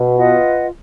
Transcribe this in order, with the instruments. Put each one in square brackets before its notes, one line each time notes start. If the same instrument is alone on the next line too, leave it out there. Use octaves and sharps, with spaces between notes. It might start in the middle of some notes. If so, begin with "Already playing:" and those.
Already playing: [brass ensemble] B2
[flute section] F4 B4 D#5 F#5